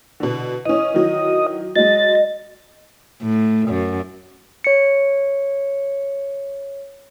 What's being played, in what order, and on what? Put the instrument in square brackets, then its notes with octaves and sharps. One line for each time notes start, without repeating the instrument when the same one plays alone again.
[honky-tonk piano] B2 D3
[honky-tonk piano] E3 C#4 [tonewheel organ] D#5
[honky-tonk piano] D#3 E3 F#3
[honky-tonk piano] F#3 G#3 [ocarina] D#5 [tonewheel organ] A6
[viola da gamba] A2
F#2
[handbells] C#5 C#7